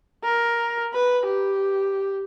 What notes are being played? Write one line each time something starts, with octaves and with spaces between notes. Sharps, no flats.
A#4
B4
G4